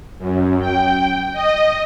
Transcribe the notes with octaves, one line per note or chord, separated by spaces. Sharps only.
F#2
G5
D#5